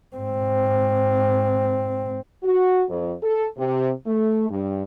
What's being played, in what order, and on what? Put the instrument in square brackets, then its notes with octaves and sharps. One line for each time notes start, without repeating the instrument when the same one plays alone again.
[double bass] G#2 C4
[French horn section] F#4
F2
A4
C3
A3
G2